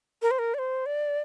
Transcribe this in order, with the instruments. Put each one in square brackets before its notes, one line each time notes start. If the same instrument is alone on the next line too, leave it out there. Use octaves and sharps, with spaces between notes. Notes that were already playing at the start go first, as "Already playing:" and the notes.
[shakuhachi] A#4
C5
A#4
D5
C5
D5